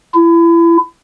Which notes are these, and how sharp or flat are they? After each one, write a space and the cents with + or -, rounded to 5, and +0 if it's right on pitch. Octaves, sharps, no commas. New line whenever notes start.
E4 +30